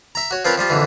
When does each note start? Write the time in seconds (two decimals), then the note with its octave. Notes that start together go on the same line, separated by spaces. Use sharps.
0.15 E5 A#5
0.31 F#4 C#5
0.45 F3 C4 F4 A#4 B4 C#5
0.58 F3 G3 F4
0.70 F2 A#2 D3 E3